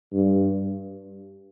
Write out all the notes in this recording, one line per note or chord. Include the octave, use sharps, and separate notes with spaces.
G2